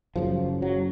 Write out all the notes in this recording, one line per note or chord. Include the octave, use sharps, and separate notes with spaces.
F#1 F#2 C#3 F3
F#3